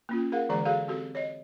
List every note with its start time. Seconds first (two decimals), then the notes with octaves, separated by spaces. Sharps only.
0.09 A#3 C#4 F4
0.32 G#4 A#4 F5 F#5
0.49 D3 E3 G#3 G#4 D5 A#5
0.65 F#4 G#4 A4 F5
0.88 C4 F#4 G4 A4
1.15 C#5 D#5